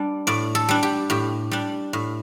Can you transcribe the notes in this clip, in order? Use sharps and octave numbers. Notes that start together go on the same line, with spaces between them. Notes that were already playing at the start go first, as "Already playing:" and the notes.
Already playing: G3 D4 D5
A2 D5
A4
G3 D4
G4
A2 G4
G3 D4
A2